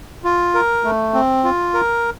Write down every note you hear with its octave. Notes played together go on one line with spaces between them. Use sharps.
F4
A#4
A3
C4
F4
A#4